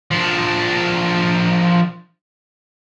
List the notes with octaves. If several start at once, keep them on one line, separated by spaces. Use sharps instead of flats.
F3 D4